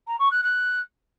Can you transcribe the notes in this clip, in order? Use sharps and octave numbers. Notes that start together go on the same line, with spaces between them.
A#5
C#6
F#6
F#6